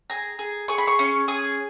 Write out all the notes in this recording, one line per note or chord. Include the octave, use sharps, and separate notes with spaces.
G#4 A#5
G#4
G#4 C#6
B5
C#6
C#4
G#4 D#6